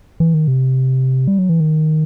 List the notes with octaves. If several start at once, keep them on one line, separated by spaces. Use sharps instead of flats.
E3
D#3
C3
G3
F#3
E3
D#3